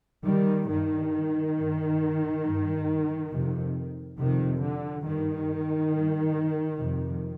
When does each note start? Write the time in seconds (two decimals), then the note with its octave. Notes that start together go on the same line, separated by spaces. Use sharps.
0.25 D#3 G3
0.69 G2 D#3
1.56 G2
2.44 G2
3.31 F2 C3
4.19 F2 C3 D#3
4.62 D3
5.06 G2 D#3
5.94 G2
6.80 F2 C3